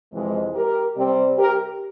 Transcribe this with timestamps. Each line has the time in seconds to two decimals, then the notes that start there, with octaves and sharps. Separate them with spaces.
0.12 F2 C3 E3 G#3
0.54 G4 A#4
0.96 C3 G3 C4
1.38 G4 A#4